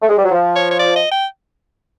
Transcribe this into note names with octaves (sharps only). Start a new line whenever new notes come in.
A3
G#3
G3
F#3
F3
C#5
C#5
D5
D#5
G5